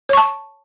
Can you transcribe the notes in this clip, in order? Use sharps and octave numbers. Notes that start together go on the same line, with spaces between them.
C#5 A5 C#6